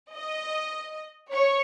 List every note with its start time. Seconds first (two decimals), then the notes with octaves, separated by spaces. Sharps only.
0.12 D#5
1.32 C#5